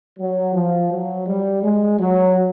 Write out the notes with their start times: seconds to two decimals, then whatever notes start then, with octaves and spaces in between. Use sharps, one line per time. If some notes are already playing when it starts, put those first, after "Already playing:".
0.19 F#3
0.55 F3
0.91 F#3
1.27 G3
1.63 G#3
1.99 F#3